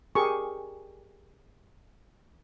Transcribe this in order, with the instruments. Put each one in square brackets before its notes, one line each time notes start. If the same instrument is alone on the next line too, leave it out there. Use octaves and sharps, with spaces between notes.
[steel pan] G4 G#4 A#4 C#6